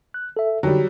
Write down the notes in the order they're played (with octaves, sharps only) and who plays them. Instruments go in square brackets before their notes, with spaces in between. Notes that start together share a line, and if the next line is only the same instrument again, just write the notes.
[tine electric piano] F#6
A4 E5
[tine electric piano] D3 D#4 G5 [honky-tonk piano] F#3 G3